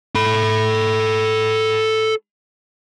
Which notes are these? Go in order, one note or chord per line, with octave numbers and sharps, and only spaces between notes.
A4 B5